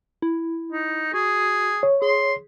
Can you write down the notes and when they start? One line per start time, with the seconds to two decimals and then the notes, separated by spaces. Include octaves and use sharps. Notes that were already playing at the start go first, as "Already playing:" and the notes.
0.22 E4
0.72 D#4
1.14 F#4 G#4
1.83 C#5
2.02 G#4 C6